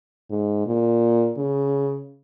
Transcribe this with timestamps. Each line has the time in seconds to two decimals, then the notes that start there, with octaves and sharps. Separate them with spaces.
0.31 G#2
0.67 A#2
1.37 C#3